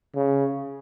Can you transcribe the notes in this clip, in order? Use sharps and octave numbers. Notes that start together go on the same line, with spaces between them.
C#3